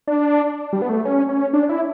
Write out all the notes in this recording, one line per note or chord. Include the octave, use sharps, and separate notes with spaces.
D4
G3
B3
A3
C#4
C#4
D4
E4